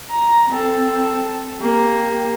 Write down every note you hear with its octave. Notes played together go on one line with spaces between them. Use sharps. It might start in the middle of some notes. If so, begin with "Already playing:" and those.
A#5
C4 A4
A#3 G4